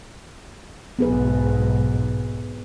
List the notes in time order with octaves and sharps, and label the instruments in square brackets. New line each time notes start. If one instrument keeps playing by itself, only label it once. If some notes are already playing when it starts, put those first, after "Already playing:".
[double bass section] B1 G#2 [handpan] B3 G#4 B4